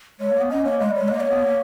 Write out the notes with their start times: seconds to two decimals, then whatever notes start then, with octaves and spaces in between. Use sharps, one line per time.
0.20 G#3 C#5
0.31 A#3
0.40 B3
0.50 C#4 D#5
0.65 A#3 C#5
0.80 G#3 D#5
0.90 G3
0.95 C#5
1.01 G#3
1.08 A#3 D#5
1.20 A#3 C#5
1.31 B3
1.42 A#3